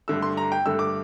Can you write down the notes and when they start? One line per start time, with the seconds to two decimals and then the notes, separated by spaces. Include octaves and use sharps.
0.08 G2 D3 A3 E6
0.22 C6
0.37 A#5
0.52 G5
0.66 G2 D3 A3 E6
0.79 D6